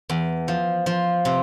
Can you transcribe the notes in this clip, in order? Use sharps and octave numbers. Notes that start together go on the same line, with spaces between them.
E2
F3
F3
C3